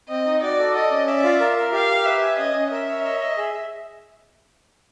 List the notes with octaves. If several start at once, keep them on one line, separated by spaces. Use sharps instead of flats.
C4 D#5
D#4
F#4 D5
A4
D5 D#5
C#4
D5 E5
F4
A#4
A#4
G4 F5
G4
B4 E5
G#5
C#4 D#5
C#4
A#4 E5
C#5
D#5
D#5
G#4